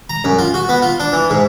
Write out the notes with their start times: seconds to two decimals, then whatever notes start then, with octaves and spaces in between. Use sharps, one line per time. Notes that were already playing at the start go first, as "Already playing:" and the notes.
0.10 A#5
0.24 F#2
0.39 F4
0.54 F#4
0.69 B3
0.82 F4
1.00 D4
1.13 E3
1.30 G#2